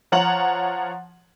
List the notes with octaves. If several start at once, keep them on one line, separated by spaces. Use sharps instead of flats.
F3 C#5 F#5 A#5 F#7